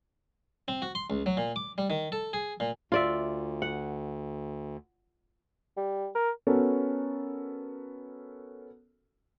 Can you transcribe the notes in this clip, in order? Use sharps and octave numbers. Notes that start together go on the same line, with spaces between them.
C4
F#4
C6
C#2
F#3
A#2
D6
G3
D#3
A4
G#4
A#2
D2 F4 D5 E5
F#5
G3
A#4
B3 C#4 F#4 A4 A#4